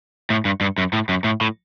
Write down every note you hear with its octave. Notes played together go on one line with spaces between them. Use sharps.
A2
G2
G2
F#2
A2
F#2
A2
A2